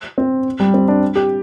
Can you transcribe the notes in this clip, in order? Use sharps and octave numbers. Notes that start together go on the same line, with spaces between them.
C4
G3
C4
D4
G4